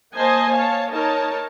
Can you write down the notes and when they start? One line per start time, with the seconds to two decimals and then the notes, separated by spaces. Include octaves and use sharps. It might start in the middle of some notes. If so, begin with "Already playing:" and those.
0.16 A#3 C5 D#5 G#5 A5
0.53 C#5 F5 A5
0.90 D#4 A#4 C#5 A5